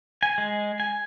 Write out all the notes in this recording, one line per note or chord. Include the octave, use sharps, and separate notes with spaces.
G#5
G#3
G#5